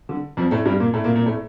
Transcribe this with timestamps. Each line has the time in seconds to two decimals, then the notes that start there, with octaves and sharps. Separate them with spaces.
0.09 D3
0.37 F2 F3
0.51 A2 A3
0.65 G2 G3
0.80 A#2 A#3
0.94 A2 A3
1.04 A#2 A#3
1.16 A#2 A#3
1.26 A2 A3